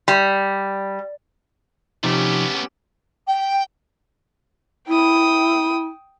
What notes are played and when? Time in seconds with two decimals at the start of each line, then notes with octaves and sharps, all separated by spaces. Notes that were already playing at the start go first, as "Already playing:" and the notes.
0.08 G3
2.03 C3 F3 A3 B3 C#4 D#4 G4
3.27 G5
4.88 E4 G5 D#6